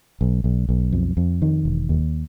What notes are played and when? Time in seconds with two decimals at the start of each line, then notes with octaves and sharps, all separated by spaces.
0.21 B1
0.44 B1
0.69 B1
0.92 F2
1.17 F2
1.42 D#3
1.65 E1
1.89 D#2